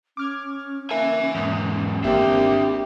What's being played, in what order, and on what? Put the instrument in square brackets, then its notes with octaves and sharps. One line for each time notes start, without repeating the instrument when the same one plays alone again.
[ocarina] C#4 [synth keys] D6 F6 G#6
[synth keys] A#3 [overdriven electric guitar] E5 G#5
[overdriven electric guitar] E2 G#2
[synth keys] G#1 A#3 C4 [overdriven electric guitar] D4 E5 [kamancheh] G4